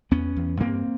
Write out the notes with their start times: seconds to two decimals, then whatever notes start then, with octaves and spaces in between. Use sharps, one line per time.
0.11 E2 B3 C#4
0.36 E2
0.60 G2 A#3 C4